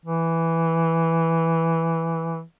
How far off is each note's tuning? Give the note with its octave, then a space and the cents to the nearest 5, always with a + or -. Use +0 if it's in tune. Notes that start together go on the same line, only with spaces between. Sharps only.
E3 +0